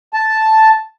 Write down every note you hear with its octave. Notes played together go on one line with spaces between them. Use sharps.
A5